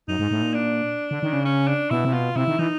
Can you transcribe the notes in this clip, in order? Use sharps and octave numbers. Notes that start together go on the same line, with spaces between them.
F#2 D#4
G#2
A2
A#2
D4
D3
D#3
C#3
C#4
D4
B2 E4
C3
B2 F4
C3 E4
D#3
E3 D#4